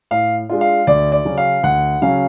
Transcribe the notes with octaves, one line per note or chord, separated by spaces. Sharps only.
A2 F5
G#3 D4 F4
F5
D2 D5
D5
C#3 F#3 C#4
F5
D2 F#5
C#3 F#3 C#4 F5